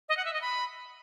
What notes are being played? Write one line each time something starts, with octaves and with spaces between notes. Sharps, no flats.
D#5
F#5
E5
D#5
B5